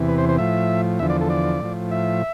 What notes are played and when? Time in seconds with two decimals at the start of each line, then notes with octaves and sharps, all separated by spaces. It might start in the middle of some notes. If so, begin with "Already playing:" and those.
Already playing: E2 C3 E3
0.08 B4
0.18 C5
0.29 C5
0.38 A2 F3 E5
0.99 E2 D3 F3 E5
1.10 D5
1.21 A4
1.30 D5
1.62 A2 F3
1.91 E5